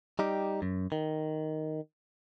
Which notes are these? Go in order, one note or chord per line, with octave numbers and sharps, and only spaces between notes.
G3 D#4 G4
F#2
D#3